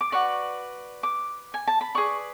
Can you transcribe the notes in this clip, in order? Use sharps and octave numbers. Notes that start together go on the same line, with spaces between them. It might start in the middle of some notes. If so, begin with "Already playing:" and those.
D6
F#4 B4 D5 C#6
D6
G#5
A5
B5
G#4 B4 D5 C#6